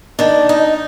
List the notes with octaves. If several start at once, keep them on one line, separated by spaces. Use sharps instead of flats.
D#3 D4
D#4